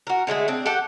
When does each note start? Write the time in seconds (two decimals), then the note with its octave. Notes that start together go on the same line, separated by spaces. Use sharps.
0.07 F#4 A#4
0.27 D3 G#3 A3 G#4
0.48 C4 D4
0.66 G4 A4 F#5